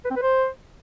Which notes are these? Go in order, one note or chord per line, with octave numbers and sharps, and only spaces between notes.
B4
C4
B4
C5